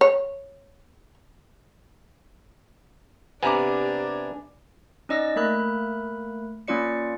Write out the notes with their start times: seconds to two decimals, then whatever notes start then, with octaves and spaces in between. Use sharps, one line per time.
0.01 C#5
3.43 C3 B3 D4 G4 G#5 A#5 D6
5.09 C#4 D#4 D5 D#5 E6 A#6
5.36 A3 A#3 A#4 B5 F#6
6.68 A#3 C#4 F4 D5 C#7